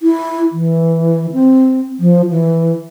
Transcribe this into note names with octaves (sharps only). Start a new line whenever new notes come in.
E4
E3
C4
F3
E3